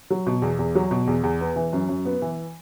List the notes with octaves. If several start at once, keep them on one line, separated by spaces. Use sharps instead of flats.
F#3
B2
E2
E2
F#3
B2
E2
E2
B3
E3
F#2
F#2
B3
E3